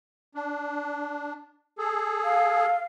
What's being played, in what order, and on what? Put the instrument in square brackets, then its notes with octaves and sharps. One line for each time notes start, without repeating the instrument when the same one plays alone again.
[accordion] D4
G#4 A4
[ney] F5